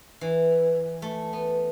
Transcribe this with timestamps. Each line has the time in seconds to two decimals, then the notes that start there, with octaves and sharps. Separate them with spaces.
0.21 E3
1.02 A3
1.33 B3